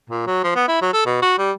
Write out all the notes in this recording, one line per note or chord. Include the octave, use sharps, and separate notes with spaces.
A#2
F#3
F3
B3
E4
F#3
A4
B2
F#4
G3